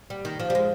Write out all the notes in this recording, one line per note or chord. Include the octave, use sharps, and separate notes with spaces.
G3
D#3
F3
G3
G#3